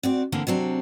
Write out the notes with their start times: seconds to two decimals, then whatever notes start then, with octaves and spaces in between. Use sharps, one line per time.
0.03 C4 F#4 D5
0.32 D3 E3 A#3 C4
0.47 C3 F#3 C4 D4